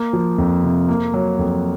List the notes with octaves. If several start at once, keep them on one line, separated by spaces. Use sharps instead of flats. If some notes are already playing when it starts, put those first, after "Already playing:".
Already playing: A#3
F3
F2
C3
A#3
F#3
F2